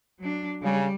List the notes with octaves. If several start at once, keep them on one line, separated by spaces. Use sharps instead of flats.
F#3 D4
C#3 G3